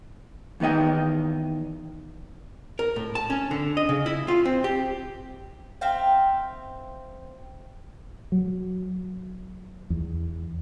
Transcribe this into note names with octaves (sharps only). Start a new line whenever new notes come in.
E2 D#3 B3 D#5 G5
A#4
A2
A5
C#4
D3
D#5
C#3
E4
F4
C4
G4
C4 E5 F5 G5
F#3
E2